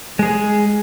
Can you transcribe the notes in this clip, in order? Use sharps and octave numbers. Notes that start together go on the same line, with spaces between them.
G#3 G#4